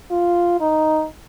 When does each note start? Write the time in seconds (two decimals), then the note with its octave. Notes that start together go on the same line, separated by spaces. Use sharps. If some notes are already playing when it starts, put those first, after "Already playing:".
0.11 F4
0.61 D#4